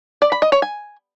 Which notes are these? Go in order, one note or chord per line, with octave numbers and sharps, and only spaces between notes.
D5
B5
D#5
C#5
G#5